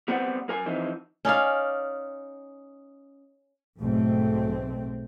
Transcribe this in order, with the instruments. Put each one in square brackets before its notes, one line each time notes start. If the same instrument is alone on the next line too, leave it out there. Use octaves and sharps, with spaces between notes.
[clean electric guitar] G3 B3 C4 C5 D5 F#5
F#2 A#4 G#5
E3 F3 C4 D#4
[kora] C#4 D#4 D5 F5
[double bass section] B1 G#2 A3 C4